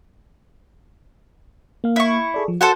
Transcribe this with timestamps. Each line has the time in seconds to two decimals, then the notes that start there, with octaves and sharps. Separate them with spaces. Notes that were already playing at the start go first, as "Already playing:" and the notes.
1.84 A#3 F5
1.96 E4 C#6
2.34 G#4 A4 D5
2.48 F3
2.61 F#4 A4 C5 F#5